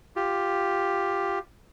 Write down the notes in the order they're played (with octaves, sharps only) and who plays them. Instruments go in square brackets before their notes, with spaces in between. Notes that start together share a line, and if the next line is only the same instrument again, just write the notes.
[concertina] F4 G4